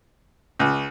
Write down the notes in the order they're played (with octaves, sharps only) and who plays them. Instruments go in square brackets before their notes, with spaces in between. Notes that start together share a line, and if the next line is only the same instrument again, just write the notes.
[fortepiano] C#2